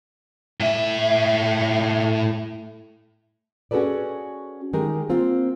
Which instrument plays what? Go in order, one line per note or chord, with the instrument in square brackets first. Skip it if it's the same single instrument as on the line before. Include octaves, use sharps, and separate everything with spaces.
[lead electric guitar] A2 E5
[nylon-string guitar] C#4 F#4 G#4 A4 B4 D5
D#3 G#3 G4 A#4
A#3 C4 F4